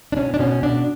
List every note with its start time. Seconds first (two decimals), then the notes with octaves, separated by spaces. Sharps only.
0.12 D4
0.17 B2 C#4
0.34 D4
0.39 B2 C#4
0.63 B2 D4